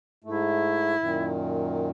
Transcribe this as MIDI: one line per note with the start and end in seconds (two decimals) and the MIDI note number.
0.24 0.95 44
0.24 0.95 57
0.24 1.34 64
1.00 1.90 42
1.00 1.90 46
1.00 1.90 51